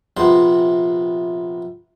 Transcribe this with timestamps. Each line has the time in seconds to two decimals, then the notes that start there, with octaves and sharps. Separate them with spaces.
0.17 A#1 C3 B3 C6